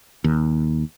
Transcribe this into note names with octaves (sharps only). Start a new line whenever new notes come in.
D#2